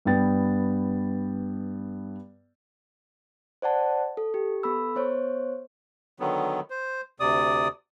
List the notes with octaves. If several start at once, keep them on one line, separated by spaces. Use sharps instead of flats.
G2 B3 G5 A6
C5 D5 F#5 A5
A4
G4
B3 A4 B5 E6
B3 C5 C#5
D3 D#3 F#3 B3
C5
D2 C3 D5 D#6